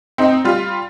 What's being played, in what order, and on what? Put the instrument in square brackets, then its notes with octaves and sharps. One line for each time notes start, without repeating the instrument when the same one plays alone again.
[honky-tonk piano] C4 D#4
G3 F4